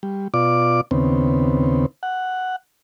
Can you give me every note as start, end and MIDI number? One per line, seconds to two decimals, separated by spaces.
0.03 0.28 55
0.34 0.81 47
0.34 0.81 65
0.34 0.81 74
0.34 0.81 86
0.91 1.86 39
0.91 1.86 49
0.91 1.86 59
0.91 1.86 60
2.03 2.56 78